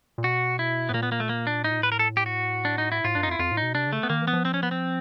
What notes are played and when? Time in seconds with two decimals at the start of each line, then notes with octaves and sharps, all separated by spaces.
0.18 A#2
0.24 B2 F#4
0.59 E4
0.89 A2 B3
0.94 A#2 A#3
1.03 B3
1.12 A#3
1.20 A3
1.29 A#3
1.47 D4
1.64 A2 D#4
1.71 A#2
1.79 A2 B4
1.92 A#4
1.99 A4
2.17 G4
2.26 F#4
2.65 D4
2.78 D#4
2.92 E4
3.04 A2 F4
3.15 G2 D4
3.23 D#4
3.27 F2
3.31 E4
3.39 F2 F4
3.52 A2
3.57 D#4
3.63 B2
3.75 C3 D4
3.87 C#3
3.93 A3
4.03 B3
4.10 D#3 A#3
4.22 E3
4.28 B3
4.33 F3
4.45 C4
4.54 C#4
4.63 B3
4.71 C4